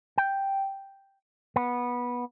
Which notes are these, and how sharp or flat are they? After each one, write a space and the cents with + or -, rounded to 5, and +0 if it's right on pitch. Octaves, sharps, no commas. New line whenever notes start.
G5 +0
B3 -15